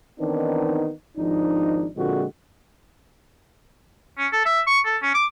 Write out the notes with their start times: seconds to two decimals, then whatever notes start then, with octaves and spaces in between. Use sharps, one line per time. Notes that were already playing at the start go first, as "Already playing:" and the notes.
0.20 D#3 E3 B3 C4 D4 D#4
1.17 G#1 F3 D4 D#4
1.96 A#2 D3 F3 G#3 C4 F#4
4.18 C#4
4.32 A4
4.46 E5
4.67 C#6
4.86 A4
5.02 C#4
5.14 D6